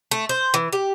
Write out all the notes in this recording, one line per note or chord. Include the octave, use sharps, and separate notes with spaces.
A3
C5
E3
G4